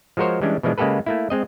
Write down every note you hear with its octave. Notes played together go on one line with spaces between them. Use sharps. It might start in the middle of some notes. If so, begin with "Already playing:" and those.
F3 G#3 F#4 A#4 C5 C#5
E3 G3 G#3 C#4 D4
B2 E3 F3 G#3 D4
C#3 G#3 A#3 G4 A4 B4
A3 A#3 E4
G#3 C4 D#5